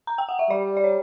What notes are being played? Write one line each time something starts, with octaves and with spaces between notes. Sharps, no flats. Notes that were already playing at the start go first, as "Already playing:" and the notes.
A#5
G5
F#5
E5
G3 D5
D5
C#5